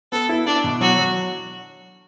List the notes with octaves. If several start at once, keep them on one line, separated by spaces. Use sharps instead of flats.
B3 A4
E4
D4 E4
B2
F#3 F#4
F#3